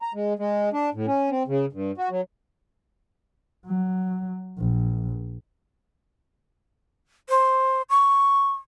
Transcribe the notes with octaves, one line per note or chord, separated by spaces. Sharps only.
A#5
G#3
G#3
D4
A2
C#4
C4
C#3
G2
F#4
F#3
F#3
A#1
C5
C#6